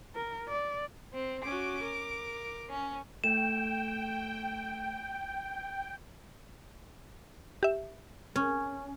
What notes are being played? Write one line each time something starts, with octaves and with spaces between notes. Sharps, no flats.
A#4
D5
C4
C#4 F#4 D6
A#4
C#4
A3 G5 E7
G4 E5
C#4